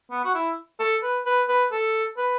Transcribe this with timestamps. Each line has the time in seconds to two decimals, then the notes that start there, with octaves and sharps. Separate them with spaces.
0.11 B3
0.24 F#4
0.34 E4
0.80 A4
1.02 B4
1.25 B4
1.48 B4
1.72 A4
2.17 B4